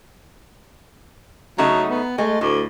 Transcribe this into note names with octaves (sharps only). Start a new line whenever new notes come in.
C#3 F#3 A3 D#4
B3
G#3 A3
D2 A2